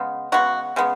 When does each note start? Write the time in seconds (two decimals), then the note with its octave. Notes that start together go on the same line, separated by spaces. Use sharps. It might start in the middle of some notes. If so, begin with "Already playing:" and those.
Already playing: C#3 G#3 B3
0.32 C#3 G#3 B3 F#4
0.76 C#3 G#3 B3